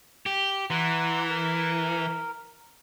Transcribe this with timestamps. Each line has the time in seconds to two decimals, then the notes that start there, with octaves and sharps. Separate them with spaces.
0.26 G4
0.70 E3 F#5 A#5 C6
1.30 A#4